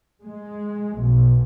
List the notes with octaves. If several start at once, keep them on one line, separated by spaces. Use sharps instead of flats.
G#3
B1